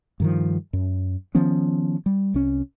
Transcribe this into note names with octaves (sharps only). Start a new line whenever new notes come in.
G2 D#3 F3
F#2
D#3 F3 B3 C#4
G3
C2 C#4